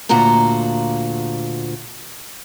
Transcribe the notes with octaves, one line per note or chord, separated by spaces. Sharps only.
D2 A#2 F4 F#4 A#5